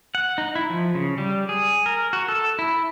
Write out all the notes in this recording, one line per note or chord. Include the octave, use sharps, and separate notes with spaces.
F#5
D#4
E4
F3
C#3
G3
G#4
A#4
F#4
A4
E4